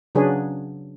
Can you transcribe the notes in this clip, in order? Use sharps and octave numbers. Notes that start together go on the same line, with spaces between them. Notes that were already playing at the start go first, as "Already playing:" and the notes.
C#3 F#3 D4 G#4 B4 C#5